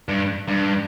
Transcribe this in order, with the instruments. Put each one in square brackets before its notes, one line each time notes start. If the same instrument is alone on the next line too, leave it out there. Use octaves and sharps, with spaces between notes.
[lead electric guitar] G2
G2